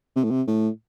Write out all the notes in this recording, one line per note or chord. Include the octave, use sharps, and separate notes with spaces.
C3
A2
C3
A2